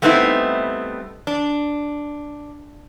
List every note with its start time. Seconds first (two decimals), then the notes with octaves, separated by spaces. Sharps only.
0.02 G3 A3 B3 C4 D#4 E4
1.27 D4